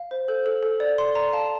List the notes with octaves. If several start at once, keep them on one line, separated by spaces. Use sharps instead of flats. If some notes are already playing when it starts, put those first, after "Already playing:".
Already playing: F5
C5
A4 G6
A4
A4
D5
D5 C6
D5 A#5
F5 A5